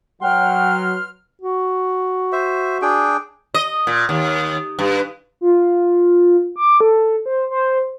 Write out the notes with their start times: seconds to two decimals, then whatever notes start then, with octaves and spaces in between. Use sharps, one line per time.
0.22 F#3 B4 F#5 G5 C6 F6
1.41 F#4
2.32 C5 E5
2.82 D4 G#4 G5
3.54 D#5
3.87 A#2
4.09 D#2
4.79 G2
5.41 F4
6.56 D6
6.80 A4
7.26 C5
7.50 C5